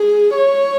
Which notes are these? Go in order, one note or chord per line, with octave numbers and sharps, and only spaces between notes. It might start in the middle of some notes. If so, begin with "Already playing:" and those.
Already playing: G#4
C#5